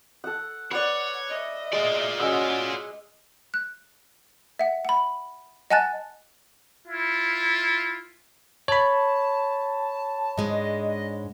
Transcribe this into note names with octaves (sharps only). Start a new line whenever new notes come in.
A4 F#5
B4 C#5 D5 F#5
D#5 E5
G#3 F4 D5
G#3 C#4 F#4 G#4 E6
F#6
E5 F#5
F#5 B5
D#5 F#5 G#5 A5 F#6 A6
E4 F4
C#5 A5 B5
G#2 G#3 D4 D#5